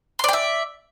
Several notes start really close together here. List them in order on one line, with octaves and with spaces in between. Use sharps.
C6 D5 G5 E5